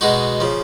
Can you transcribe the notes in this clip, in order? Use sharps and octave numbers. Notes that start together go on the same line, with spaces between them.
B2 G#3 D#4 F#4
C#3 F3